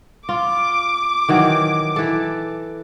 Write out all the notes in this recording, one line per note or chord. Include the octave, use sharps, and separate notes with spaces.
F4 D6
D#3 E3 F#3
E3 A4